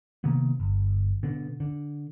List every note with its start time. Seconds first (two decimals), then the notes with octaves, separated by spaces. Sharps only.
0.24 C3 D#3 A#3 B3
0.60 G1
1.23 B2 D3
1.60 D3